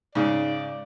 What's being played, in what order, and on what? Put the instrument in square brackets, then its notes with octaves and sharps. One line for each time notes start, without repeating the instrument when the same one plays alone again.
[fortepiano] G#2 C#3 [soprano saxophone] D5